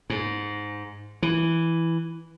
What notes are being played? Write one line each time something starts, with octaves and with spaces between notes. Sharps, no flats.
G#2
E3